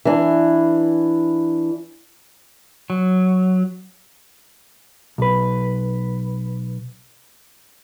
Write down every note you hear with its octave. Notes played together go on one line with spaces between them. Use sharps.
E3 D4
F#3
B1 B4